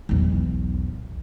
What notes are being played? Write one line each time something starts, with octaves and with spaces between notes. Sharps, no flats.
B1 E2